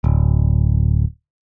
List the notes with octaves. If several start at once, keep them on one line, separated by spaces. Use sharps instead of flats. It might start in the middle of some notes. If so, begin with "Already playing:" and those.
D1